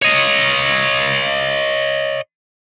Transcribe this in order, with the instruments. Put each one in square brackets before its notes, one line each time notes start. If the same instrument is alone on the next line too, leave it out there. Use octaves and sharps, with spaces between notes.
[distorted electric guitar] C#5 D#5